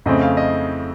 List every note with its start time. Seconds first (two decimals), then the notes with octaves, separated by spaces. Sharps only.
0.06 F2 C#3 A3 C4 D#5
0.21 F5
0.37 D#5